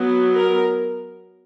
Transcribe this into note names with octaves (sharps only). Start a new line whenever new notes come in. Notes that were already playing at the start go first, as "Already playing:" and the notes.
Already playing: F#3 B3
A#4